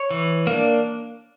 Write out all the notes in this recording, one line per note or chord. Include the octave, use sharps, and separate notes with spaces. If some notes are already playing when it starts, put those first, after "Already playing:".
Already playing: C#5
E3
A#3 D4